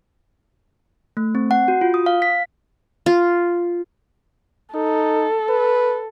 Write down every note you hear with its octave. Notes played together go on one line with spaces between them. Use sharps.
A3
C4
F#5
F#4
F4
D#6
F5
B6
F4
D#4 A4
B4